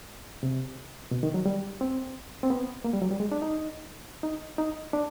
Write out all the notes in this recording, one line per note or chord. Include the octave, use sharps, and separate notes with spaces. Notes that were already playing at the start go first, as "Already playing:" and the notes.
C3
B2
D#3
F#3
G3
C4
C4
B3
A#3
G3
F#3
G3
G#3
D4
D#4
D#4
D#4
D4